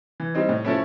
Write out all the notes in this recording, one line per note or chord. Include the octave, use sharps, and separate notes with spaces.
E3
G3 C4 D#4
A2
F3 A3 C#4 E4